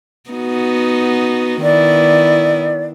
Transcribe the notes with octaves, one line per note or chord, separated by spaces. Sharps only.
B3 D#4 F#4
D#3 B3 E4 D5